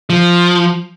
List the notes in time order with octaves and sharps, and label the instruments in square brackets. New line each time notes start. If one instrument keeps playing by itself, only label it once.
[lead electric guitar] F3